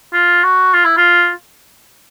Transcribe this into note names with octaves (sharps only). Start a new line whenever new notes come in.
F4
F#4
F4
E4
F4